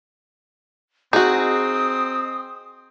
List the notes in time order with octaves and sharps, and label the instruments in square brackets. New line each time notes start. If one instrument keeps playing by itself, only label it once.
[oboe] C4 [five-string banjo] D#4 F#4 [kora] G#4 [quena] D#6